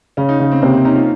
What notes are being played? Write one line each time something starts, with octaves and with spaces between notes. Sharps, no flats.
C#3 C#4
D#4
C#3 C#4
C4
C3 A#3
C4
C#4 D#4
F4